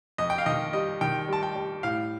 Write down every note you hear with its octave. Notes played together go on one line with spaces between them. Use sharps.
F2 D#5
G5
F5
D#3 D#5
G3 D#5
D#3 G5
G3 A5
G5
G3
A2 F5